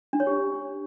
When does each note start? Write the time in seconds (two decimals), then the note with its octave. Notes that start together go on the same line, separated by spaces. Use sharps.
0.13 D4
0.20 C#5
0.27 G4